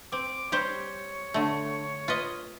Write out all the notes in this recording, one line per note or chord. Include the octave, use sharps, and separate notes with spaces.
C4 D6
G3 G4 C5 C#5
D3 A3
F4 B4 D#5